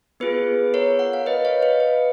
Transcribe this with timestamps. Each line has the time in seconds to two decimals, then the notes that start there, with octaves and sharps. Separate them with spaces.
0.20 B3 F4 G#4 B4
0.74 A#4 C#5
0.99 F#5
1.13 F5
1.26 B4 D#5
1.45 C#5 F5
1.62 B4 D#5
1.80 B4